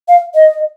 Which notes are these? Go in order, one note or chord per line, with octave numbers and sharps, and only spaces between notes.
F5
D#5